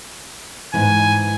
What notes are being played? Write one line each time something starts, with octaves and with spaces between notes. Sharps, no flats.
G#2 E3 G#5